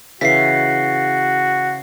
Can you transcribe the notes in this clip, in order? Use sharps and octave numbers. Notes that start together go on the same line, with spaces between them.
C#3 E3 F#4 B6 C7